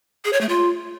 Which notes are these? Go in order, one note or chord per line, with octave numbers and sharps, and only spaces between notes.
G#4
C#5
A3
F4